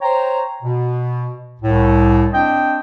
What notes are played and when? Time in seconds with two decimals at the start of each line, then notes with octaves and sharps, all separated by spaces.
0.01 C5 C#5 G5 A#5
0.63 B2
1.61 C2 A2
2.33 C4 D4 D#5 G5